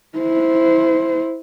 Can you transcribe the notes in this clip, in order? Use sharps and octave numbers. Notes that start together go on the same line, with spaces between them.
E4 C5